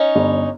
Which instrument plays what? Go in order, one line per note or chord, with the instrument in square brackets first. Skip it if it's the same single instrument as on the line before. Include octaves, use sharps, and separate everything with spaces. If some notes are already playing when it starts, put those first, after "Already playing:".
Already playing: [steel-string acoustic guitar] C#4 D#4
[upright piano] G1